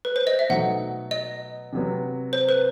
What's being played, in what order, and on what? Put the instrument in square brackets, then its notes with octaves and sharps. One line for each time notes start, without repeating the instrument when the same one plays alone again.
[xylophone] B4
C5
D#5
E5
[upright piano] B2 F#3 A3 D#4 [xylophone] F#5
[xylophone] D#5
[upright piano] C3 F#3 B3
[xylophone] C5
B4